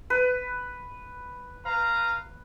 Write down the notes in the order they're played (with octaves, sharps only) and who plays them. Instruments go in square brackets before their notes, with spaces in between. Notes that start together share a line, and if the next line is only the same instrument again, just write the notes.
[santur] B4
[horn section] B4 F5 A#5